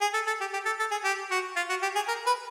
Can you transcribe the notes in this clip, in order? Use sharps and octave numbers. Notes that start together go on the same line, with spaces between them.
G#4
A4
A4
G4
G4
A4
A4
G#4
G4
F#4
F4
F#4
G4
G#4
A#4
B4